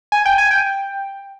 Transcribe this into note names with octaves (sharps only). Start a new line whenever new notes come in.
G#5
G5
G#5
G5